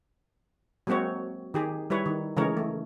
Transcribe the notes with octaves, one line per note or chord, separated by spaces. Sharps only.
F#3 G#3 A#3 C4 F#4 C#5
D#3 G4 G#4
G3 E4 B4 C#5
D#3
C#3 E3 G#3 A3 A#4 C#5
A3